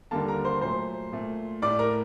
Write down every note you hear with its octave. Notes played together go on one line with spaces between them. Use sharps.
D#2 D3 G3 A#3 A4 A5
A#4 A#5
C5 C6
A#2 F#3 A3 C5 C6
A#2 A3
A2 A3 D5 D6
A#4 A#5